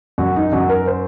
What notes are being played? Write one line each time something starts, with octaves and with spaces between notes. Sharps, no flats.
F#2 F#4
D#4
F#2 F#4
A#4
C5